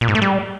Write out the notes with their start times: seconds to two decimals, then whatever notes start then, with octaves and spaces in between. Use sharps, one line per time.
0.01 A#2
0.08 G#2
0.15 A3
0.22 G3